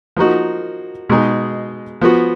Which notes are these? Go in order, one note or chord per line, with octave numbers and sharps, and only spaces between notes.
F3 A#3 D#4 F#4
B2 G#3 D#4 G#4
F3 B3 F#4